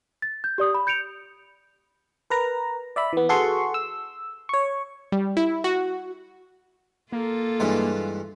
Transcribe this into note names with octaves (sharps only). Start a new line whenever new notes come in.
A6
G6
G4 D5 D#6
B5
G6 C#7 D7 F7
A#4 B4 A#5
D5 E5 B5
E3 B3
F#4 G#4 A4 F#5 C6 C#6
E6
C#5 C#6
G3
E4
F#4
A#3 F4 A4
G2 E3 G#3